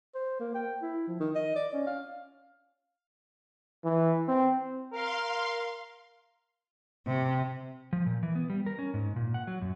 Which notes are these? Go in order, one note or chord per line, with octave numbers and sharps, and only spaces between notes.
C5
A#3
G5
E4
F3
D#3
D#5
D5
C#4
F5
E3
C4
A#4 F5 C6
C3
F3
A#2
E3
B3
G3
A#4
C#4
G#2
A#2
F#5
F#3
F#2